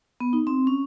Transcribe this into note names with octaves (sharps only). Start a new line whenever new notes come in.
B3
D#4
C4
C#4